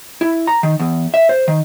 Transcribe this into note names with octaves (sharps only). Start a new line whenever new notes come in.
E4
A#5
D#3
E2
E5
C5
D#3